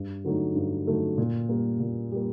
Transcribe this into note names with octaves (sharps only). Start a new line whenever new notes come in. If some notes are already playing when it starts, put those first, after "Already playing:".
Already playing: G2
D3 F#3 A3 D#4
G2
D3 F#3 A3 D#4
A#2
G3 A#3
A#2
G3 A#3